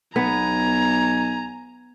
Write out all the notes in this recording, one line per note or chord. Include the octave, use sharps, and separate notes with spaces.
B1 B3 G#5 A#5